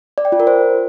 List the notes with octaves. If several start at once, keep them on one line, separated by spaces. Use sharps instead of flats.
D5
G5
F4
A#4
C5